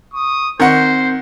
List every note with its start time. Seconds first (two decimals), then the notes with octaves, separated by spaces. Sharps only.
0.13 C#6 D#6
0.60 D#3 C4 A#4 C5 F#5 C#6